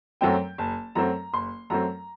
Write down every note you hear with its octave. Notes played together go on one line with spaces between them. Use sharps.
F#2 F#3 A3 C4 G5
F#1 A5
F#2 F#3 A3 C4 A#5
F#1 C6
F#2 F#3 A3 C4 A#5